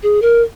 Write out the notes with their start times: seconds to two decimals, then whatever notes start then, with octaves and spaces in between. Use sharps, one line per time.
0.03 G#4
0.22 A#4